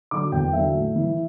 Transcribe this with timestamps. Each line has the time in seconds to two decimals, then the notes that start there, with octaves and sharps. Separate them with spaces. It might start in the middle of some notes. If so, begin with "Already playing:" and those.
0.11 D3 F#3 D6
0.32 E2 G5
0.53 D3 F#3 E5
0.75 A2
0.95 E3